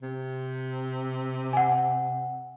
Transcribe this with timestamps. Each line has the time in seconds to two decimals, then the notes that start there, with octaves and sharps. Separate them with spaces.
0.02 C3
1.53 F#5 G#5